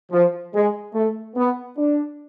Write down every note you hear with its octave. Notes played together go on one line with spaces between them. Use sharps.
F3
G#3
A3
B3
D4